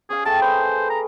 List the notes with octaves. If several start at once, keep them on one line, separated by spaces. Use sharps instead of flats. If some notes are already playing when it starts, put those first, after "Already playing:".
C#4 G#4 F5
A3 G#4 G5 A5
B4 C5 D#6
A#5